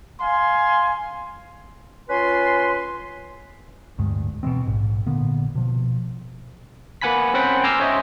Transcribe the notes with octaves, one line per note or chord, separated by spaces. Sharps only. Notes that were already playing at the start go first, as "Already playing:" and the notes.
F5 G#5 C6
C#4 F4 B4 G#5 C6
D1 D2 G2 G#3
B2 E3 G#3 C4
A#1 G#2
A#2 D3 A#3 B3
B2 F3
A#3 B4 F#5 G#5 B5 B6
C4 C#4 C5 F#5 G5 B5
G#5 A#5 C6 D6 E6 F6
C#4 C5 C#5 D#5 E5